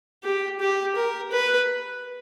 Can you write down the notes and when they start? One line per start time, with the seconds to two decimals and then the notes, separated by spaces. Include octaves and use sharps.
0.23 G4
0.60 G4
0.95 A#4
1.31 B4